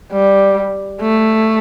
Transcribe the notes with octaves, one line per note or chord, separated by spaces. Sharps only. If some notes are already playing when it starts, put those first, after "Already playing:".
G3
A3